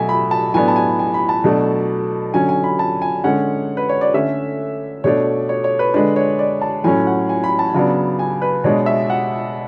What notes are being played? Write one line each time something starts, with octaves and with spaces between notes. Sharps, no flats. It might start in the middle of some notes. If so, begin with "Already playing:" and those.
Already playing: B2 F#3 A3 E5 G#5
B5
A5
A2 F#3 B3 D4 G#5
A5
G#5
G#5
B5
A5
B2 F#3 A3 D4
D3 F#3 C#4 G#5
G#5
B5
A5
G#5
D3 G#3 C#4 F#5
B4
C#5
D5
D3 A3 C#4 E5
B2 A3 D4 C#5
C#5
C#5
B4
D3 G#3 D4 B4
C#5
D5
A5
A2 F#3 C#4 G#5
F#5
G#5
B5
A5
C#3 F#3 B3 D4
G#5
B4
B2 G#3 D4 C#5
E5
F#5